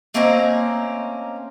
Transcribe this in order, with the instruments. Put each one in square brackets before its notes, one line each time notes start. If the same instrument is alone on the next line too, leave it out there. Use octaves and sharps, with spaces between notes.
[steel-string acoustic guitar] A3 A#3 C4 C#4 D#5 A#5